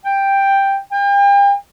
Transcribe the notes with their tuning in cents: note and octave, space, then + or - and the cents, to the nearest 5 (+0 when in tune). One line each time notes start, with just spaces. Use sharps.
G5 +5
G5 +40